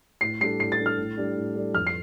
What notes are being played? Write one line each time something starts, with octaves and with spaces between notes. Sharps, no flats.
A2 C7
G3 D4 A4 C7
A2 C7
A6
G3 D4 A4
F6
A2
G3 D4 A4 D5
A2
G3 D4 A4 D5
F2 F6
C7